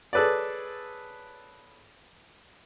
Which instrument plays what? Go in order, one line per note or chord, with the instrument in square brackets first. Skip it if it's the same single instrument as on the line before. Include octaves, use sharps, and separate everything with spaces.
[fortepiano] G#4 A4 B4 C#5 D5